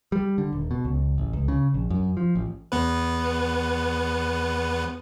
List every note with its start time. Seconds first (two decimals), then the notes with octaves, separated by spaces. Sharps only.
0.12 G3
0.38 D3
0.53 D#1
0.71 B2
0.85 C#2
1.18 A1
1.33 C#2
1.48 C#3
1.74 A#1
1.90 F#2
2.17 F3
2.35 A1
2.72 E2 B3 B4